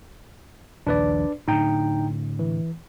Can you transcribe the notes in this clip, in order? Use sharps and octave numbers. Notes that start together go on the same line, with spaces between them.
A#1 D#2 D4 B4 D5
A2 D3 D#4 G5 A#5
E3